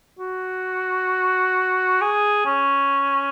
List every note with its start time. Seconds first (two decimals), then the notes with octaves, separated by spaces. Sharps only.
0.19 F#4
2.01 G#4
2.46 C#4